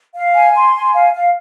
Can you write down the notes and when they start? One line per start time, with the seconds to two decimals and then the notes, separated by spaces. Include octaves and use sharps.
0.15 F5
0.35 G#5
0.55 C6
0.75 G#5
0.94 F5
1.14 F5